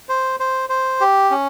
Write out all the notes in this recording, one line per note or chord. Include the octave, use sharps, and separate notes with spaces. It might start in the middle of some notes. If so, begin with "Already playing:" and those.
C5
C5
C5
G4
C#4